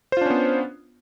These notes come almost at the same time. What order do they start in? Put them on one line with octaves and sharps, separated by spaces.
C5 F4 D4 C#4 B3